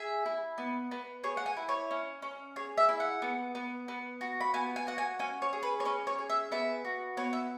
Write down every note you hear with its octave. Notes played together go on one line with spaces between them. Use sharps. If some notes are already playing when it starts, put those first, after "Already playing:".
Already playing: G#4 E5
E4
B3
B3
G#4 C#5
F#5
G#5
E4
C#5
C#4
C#4
G#4 C#5
E5
E4
F#5
B3
B3
B3
F#4
B5
B3 G#5
G#5
F#4 F#5
G#5
C#4 G#5
C#5
G#4
B4
C#5
C#4 B4
C#5
G#4
E5
B3 E5
F#4
B3 C#5
E5